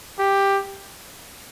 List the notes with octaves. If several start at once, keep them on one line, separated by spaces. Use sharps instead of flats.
G4